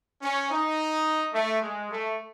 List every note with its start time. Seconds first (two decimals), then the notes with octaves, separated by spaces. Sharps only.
0.22 C#4
0.50 D#4
1.33 A3
1.61 G#3
1.90 A3